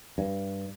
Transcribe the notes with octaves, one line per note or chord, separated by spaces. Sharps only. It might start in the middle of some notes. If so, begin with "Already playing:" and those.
G2